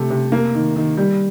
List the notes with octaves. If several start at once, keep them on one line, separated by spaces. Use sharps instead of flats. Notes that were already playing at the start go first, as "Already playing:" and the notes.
Already playing: C3 A3
C3
A#3
D#3
D#3
G3